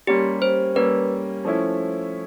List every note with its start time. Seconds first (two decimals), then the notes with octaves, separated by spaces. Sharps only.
0.07 G3 A#3 C#4 G4
0.42 C5
0.75 G3 A#3 C#4 B4
1.45 F3 A3 C#4 E4